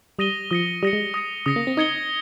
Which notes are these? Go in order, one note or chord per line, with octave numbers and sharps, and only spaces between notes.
G3 D#6 A#6 D#7 G7
F3 D#6 A#6 C#7
G3 D#6 A#6 C#7
G#3
D#6 A#6 C#7
C#3 D#6 A#6 C#7
A#3
C4
D#4 D#6 G#6 C#7 G7